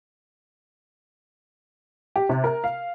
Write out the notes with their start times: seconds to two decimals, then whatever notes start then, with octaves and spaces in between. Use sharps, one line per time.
2.16 G4
2.29 C3
2.44 A#4
2.64 F5